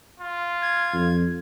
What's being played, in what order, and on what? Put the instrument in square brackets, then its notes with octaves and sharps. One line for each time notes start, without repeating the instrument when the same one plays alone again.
[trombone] F4
[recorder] G#6
[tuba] F2